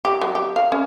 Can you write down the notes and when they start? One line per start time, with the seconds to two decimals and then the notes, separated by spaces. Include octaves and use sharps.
0.05 G4
0.21 F#3
0.35 G4
0.56 F5
0.72 C#4